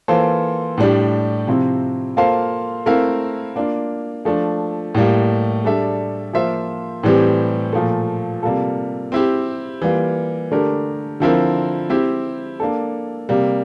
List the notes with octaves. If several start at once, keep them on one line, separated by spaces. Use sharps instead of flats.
E3 A#3 F4 A4 C5
A2 G3 D4 G4
C3 F3 C4 E4
A#3 F4 A4 C5 F5
A3 C4 E4 A#4 F5
A#3 D4 F4
F3 A3 D4
A2 G3 A#3
G3 D4 A4 E5
F3 A#3 F4 C5 E5
A2 E3 G3 C4 G4
A#2 F3 A3
C3 G3 A#3 F4 A4
C4 E4 G4
E3 G3 A#3 F4
D3 A3 D4 G4 A#4
D3 F3 C4 E4 A#4
C4 E4 G4
A#3 D4 A4
C3 G3 A#3